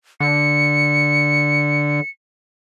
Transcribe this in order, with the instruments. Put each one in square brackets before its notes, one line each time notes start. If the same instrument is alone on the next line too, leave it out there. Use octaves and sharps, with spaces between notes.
[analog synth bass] D3 [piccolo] C#7